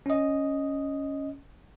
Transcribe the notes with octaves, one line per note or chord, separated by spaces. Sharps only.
C#4 D#5